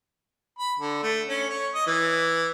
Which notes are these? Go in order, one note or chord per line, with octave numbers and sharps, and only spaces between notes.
B5
D3
A3
C#4
C#5
D#5
E3